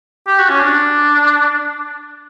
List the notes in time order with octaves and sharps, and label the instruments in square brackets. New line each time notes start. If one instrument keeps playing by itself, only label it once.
[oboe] G4
F#4
C#4
D4